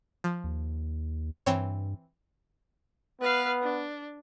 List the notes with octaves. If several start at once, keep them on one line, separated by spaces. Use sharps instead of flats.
F3
D#2
G2 E3 C4 C#5
B3 B4 F5
D4